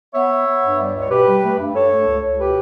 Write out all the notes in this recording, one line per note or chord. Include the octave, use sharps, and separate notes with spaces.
B3 C#5 E5
B3
B3
G2
G3
C#2
C#5
B2 G4 B4
G3
A3
G2
G2 A4 C#5
A3
C#2
C#2
B2 G4 B4